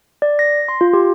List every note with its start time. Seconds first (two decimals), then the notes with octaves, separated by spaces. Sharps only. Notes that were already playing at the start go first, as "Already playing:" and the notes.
0.22 D5
0.39 A#6
0.68 C6
0.81 F4
0.93 G4